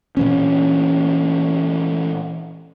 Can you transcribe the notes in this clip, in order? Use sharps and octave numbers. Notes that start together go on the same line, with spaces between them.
A#2 E3 C#4